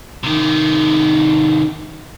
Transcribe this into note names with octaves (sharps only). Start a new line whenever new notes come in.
C3 D#3